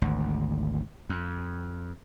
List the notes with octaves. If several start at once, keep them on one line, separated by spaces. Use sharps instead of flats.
G#1 D2
F2